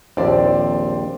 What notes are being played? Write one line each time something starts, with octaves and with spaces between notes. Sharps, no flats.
A#1 D#2 C4 D5